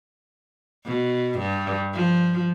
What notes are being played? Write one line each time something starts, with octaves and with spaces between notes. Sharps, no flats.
B2
G2
F3